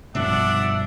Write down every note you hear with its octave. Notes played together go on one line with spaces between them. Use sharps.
B1 G2 F3 D4 E5 F#5 D6